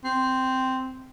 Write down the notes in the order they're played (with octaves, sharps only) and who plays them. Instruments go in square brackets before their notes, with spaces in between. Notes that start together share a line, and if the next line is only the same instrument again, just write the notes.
[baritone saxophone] C4